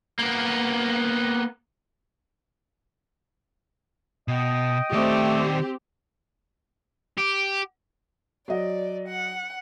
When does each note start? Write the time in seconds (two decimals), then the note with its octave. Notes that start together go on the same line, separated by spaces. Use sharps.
0.19 A#3 B3
4.28 B2 D#5 G5 D#6
4.92 D#3 A3 C4 G4 D5
7.18 G4
8.48 F#3 D5 D#5
9.08 F#5